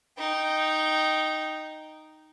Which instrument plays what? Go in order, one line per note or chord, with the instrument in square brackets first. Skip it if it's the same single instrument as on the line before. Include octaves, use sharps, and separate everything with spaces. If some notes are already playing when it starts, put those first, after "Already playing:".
[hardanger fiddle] D#4 G5